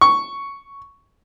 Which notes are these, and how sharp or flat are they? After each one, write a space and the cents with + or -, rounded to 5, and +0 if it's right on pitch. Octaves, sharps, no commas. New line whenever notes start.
C#6 +5